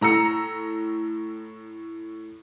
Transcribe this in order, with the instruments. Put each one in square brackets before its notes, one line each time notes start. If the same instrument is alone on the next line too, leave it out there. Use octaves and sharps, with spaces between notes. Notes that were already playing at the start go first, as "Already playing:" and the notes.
[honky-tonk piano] A2 A#5 E6 C#7